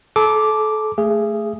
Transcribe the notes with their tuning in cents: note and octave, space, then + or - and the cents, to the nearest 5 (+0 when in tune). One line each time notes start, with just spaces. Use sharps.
A4 -30 A#5 +0 D6 +0
A3 +0 G#4 +0 E5 +35